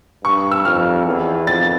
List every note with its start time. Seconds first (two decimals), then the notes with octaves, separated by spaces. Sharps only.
0.24 G2 C#6
0.51 E6
0.65 F2 F6
1.06 E2
1.47 F2 A6